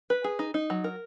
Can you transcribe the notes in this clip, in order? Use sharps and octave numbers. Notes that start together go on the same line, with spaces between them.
B4
G#4
D#4
D#4
F#3
A#4